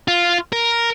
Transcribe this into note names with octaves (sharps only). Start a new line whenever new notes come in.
F4
A#4